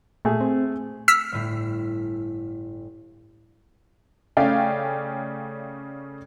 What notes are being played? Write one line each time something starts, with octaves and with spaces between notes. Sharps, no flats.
A#2 A3 G#4
C4
E6 F6 B6
G1 A2 C7
C#3 A3 C#4 D5 F5 G5